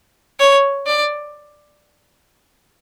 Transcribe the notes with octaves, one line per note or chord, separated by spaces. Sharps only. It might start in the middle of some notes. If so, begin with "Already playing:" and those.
C#5
D5